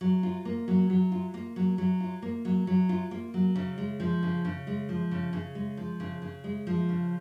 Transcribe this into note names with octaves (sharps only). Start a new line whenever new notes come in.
F#3
F4
A#3
F#3
F#3
F4
A#3
F#3
F#3
F4
A#3
F#3
F#3
F4
A#3
F#3
C#3
G#3
F3
C#3
C#3
G#3
F3
C#3
C#3
G#3
F3
C#3
C#3
G#3
F3
C#3